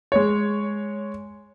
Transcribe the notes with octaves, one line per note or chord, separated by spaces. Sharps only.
G#3 C#5